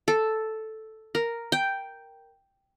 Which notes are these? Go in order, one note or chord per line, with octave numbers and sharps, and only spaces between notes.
A4
A#4
G5